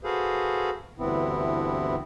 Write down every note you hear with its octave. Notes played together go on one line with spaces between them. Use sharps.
F#4 G#4 A4 B4 C5 F5
D2 G2 E3 B3 C4 E4